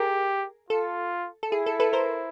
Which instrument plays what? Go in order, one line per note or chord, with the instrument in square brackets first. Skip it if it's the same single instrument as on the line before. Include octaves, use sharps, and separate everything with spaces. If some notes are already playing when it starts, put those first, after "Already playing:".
Already playing: [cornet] G4 [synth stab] G#4 A#4
[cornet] F4 [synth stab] A4
[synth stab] A4
[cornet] E4 [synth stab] G#4
[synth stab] A4
A4 B4
A#4 C5